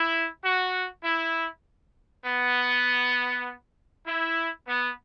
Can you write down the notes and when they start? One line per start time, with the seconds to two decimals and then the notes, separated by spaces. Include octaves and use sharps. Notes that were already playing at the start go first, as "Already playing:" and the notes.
Already playing: E4
0.44 F#4
1.04 E4
2.25 B3
4.06 E4
4.67 B3